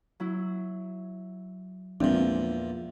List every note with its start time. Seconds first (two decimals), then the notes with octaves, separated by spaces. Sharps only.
0.20 F#3 E4
2.01 E2 A#2 F3 G#3 C4 D4